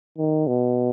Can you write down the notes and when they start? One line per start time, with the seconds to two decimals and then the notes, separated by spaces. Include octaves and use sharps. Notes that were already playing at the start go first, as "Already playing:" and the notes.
0.18 D#3
0.48 B2